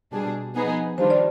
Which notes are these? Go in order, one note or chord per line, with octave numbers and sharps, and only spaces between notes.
B2 G3 D4 G#4
F3 B3 D#4 G#4
D#3 G3 D4 F4 C5
D5